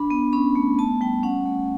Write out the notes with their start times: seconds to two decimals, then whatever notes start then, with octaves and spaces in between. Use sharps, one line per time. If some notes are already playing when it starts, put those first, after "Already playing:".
Already playing: D4 B5
0.10 B3
0.33 C#4 B5
0.55 A3
0.78 B3 A5
1.01 G3 G5
1.23 C#4 F#5
1.46 A3